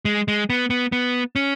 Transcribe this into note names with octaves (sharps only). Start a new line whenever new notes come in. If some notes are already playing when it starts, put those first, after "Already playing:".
G#3
G#3
B3
B3
B3
C#4